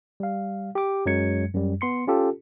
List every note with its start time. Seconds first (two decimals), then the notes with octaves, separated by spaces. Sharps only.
0.20 G3 F5
0.75 G4 D6
1.06 F#2 F#3 G#3 G#6 C#7
1.54 F#2 G3
1.81 B3 C6 C#7
2.07 C#4 F4 G4 A4